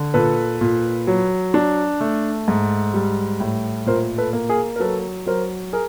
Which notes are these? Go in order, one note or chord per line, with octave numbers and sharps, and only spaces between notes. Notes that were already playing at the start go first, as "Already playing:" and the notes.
Already playing: D3
A#2 A4 B4
A#2
F#3
D4
A3
G#2
G3
A2
A#2 A#4 C5
A4 B4
A#3
G#4 A#4
A#4
F#3 A4 B4
F#3 A#4 C5
G#4 A#4